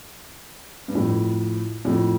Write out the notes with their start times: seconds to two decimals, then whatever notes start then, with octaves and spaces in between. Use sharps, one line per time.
0.88 G2
0.95 F2 A2
1.85 F2 A2